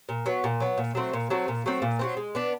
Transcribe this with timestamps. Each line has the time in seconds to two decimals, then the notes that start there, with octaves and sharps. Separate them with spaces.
0.09 A#2
0.26 F#3 B3
0.44 A#2
0.60 F#3 B3
0.78 A#2
0.95 F#3 A3 C4
1.13 A#2
1.30 F#3 A3 C4
1.48 A#2
1.66 F#3 A3 C4
1.82 A#2
1.99 F#3 A3 C4
2.17 G#3
2.35 B3 D4